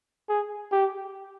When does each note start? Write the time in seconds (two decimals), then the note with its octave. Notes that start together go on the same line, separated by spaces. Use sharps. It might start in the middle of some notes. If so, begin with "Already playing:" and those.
0.29 G#4
0.72 G4